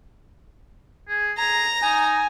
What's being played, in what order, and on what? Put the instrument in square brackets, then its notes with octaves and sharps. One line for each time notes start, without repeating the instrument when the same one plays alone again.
[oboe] G#4
[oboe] G#4 [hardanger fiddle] A#5
[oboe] D#4 [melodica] G#5